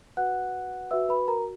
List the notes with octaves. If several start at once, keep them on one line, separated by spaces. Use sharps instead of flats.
F#4 B4 F#5 F#6
F#4 B4 E5 E6
B4 B5
A#4 A#5